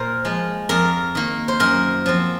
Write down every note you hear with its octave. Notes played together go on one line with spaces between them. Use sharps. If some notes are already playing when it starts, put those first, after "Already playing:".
Already playing: A#2 A#4 C5
F3 G#3
F2 A#4
D#3 A#3
C5
F#2 A#4
F3 C4